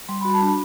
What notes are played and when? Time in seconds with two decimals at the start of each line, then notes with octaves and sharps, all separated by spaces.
0.09 G3 C6
0.21 F#4 B5
0.34 A5
0.42 D4 B5